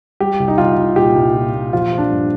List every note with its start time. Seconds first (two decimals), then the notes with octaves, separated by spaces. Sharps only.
0.20 G3 G4
0.40 C2
0.48 D#4
0.58 C2 F4
0.77 C2
0.96 A#2 G4
1.16 C2
1.34 A#2
1.54 A#2
1.73 F3 F4
1.92 F3
1.98 D4
2.11 G2